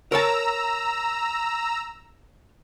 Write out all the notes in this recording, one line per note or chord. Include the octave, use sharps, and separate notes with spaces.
A#4 C#5 A5 A#5 E6